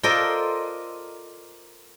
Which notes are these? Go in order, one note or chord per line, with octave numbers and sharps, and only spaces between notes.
F4 A4 A#4 C5 D5 D#5